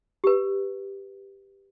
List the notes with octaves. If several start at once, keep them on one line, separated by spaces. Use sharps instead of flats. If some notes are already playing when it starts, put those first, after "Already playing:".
G4 B4